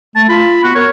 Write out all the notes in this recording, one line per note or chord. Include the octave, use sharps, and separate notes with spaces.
A3 A5
F4 B5
B3 F#4
A#4 C#5